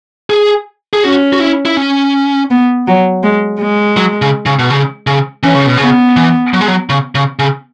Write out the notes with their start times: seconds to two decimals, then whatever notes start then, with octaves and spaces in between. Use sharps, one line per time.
0.30 G#4
0.93 G#4
1.03 C#4 F#4
1.33 F#4
1.40 E4
1.65 E4
1.77 C#4
2.50 B3
2.87 F#3
3.23 G#3
3.60 G#3
3.97 F#3
4.22 C#3
4.46 C#3
4.59 B2
4.70 C#3
5.07 C#3
5.43 E3 C#4
5.55 C#3
5.67 B2
5.77 C#3 B3
6.17 E3
6.54 F#3
6.61 G#3
6.68 F#3
6.90 C#3
7.15 C#3
7.39 C#3